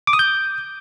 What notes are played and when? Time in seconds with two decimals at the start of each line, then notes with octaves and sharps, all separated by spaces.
0.07 D6
0.13 D#6
0.19 G6